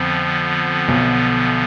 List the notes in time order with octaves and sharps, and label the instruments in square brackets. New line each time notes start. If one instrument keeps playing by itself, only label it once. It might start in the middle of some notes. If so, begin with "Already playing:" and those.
Already playing: [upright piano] F2 [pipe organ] D3 F3 B3
[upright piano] B1 B2